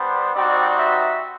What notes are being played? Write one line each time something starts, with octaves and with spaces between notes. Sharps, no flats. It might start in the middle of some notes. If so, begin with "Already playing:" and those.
Already playing: G3 B3 D4 C5
G3 C4 D#4 F#4 D5
E5